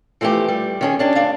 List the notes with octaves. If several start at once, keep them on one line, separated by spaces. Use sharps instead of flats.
E3 F3 A3 B3 G4
G3
D#3 C#4 G#4
C#4 D4 G4
D2 D4 F5